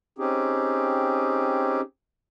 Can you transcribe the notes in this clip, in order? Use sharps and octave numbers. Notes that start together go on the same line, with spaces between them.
C4 C#4 D#4 G4 G#4